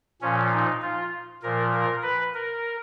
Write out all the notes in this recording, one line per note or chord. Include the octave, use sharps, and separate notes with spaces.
A#2 F3 C#4
D#4
F4
A#2 F3 A#4
A#4
B4
A#4